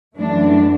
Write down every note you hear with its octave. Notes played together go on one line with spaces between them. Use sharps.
F#2 E3 A3 D4